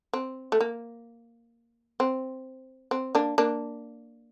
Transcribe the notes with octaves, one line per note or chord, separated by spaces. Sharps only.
C4
A3
A#3
C4
C4
A#3 D4
A#3 D4